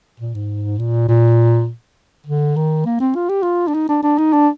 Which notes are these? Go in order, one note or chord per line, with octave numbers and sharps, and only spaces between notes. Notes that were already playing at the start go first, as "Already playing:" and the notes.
A#2
G#2
A#2
A#2
D3
D#3
A#3
C4
F4
G4
F4
D4
D#4
D4
D4
D#4
D4